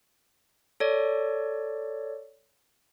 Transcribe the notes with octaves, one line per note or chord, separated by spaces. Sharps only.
A4 C#5 D5